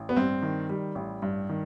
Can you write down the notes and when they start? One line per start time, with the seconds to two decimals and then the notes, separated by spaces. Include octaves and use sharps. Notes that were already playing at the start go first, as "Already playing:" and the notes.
Already playing: A1
0.09 B3
0.16 G2 C4
0.42 D#3
0.69 G3
0.95 A1
1.22 G2
1.49 D#3